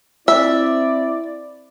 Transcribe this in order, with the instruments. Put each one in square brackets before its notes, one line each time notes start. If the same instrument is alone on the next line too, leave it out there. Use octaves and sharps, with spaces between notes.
[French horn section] C4 E4 [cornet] D5 [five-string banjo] E5